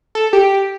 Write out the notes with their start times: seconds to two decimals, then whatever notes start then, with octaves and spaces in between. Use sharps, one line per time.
0.15 A4
0.33 G4